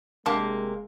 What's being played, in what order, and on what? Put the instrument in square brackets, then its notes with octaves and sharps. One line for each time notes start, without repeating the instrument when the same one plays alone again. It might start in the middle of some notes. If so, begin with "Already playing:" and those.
[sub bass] F1 [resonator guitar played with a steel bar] C3 A#3 [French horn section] G#3 [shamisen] D4 A5